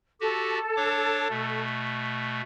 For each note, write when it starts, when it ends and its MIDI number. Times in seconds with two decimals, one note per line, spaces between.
0.21 0.59 66
0.21 0.59 67
0.21 1.60 69
0.76 1.28 62
0.76 1.28 73
0.76 1.28 86
1.30 2.41 47
1.30 2.41 57